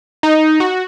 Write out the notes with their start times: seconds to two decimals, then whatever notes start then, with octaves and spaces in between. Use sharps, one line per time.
0.23 D#4
0.60 F#4